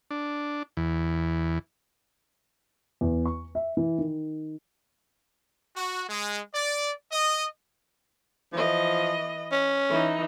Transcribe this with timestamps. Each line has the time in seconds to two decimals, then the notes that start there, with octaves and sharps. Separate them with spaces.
0.11 D4
0.77 E2
3.01 E2
3.26 C#6
3.55 E5
3.77 E3
3.98 D#3
5.74 F#4
6.08 G#3
6.54 D5
7.12 D#5
8.53 E3 F3 D#5
9.52 C#4
9.89 E3 D#4